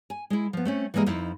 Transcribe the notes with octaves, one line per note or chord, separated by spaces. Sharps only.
G#5
G#3 E4
F3 B3
A3 C4 C#4
E3 G3 G#3 A#3 D#5
F2 D#4 E4